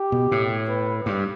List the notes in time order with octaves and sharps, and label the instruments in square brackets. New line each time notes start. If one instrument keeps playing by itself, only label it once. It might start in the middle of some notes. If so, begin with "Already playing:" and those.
Already playing: [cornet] G4
[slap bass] B2
A2
[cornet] B4
[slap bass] G2